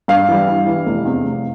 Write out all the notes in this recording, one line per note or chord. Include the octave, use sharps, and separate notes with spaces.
G2 F5
E3 G3
G2
E3 G3
F1
E2 C3
F1